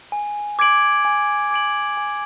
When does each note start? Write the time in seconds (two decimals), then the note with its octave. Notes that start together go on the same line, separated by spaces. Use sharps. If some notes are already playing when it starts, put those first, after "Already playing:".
0.12 G#5
0.59 D6 G#6 D7 F#7
1.05 G#5
1.51 D6 G#6 D7 F#7
1.97 G#5